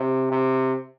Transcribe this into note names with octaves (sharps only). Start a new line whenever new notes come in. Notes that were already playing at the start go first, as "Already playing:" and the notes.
Already playing: C3
C3